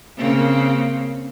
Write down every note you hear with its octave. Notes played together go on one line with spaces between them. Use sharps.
C#3 A#3 C4